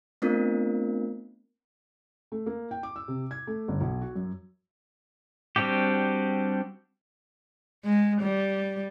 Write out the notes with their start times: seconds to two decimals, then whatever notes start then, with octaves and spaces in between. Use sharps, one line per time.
0.22 A3 B3 C4 D4 F4 A#4
2.32 A3
2.46 A#3
2.71 G5
2.83 D6
2.96 E6
3.08 C3
3.31 G#6
3.47 A3
3.68 G1
3.81 B1
4.01 F#4
4.16 F#2
5.56 G3 C4 D4 F#4 G4
7.84 G#3
8.22 G3